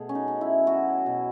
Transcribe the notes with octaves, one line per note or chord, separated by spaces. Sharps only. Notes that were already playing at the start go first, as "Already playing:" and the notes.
Already playing: B2 A3 G#4
C#4
D#4
C#4
E4
F#3 F#4
B2